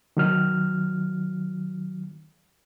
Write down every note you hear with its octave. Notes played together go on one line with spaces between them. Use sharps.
D#3 F#3 F6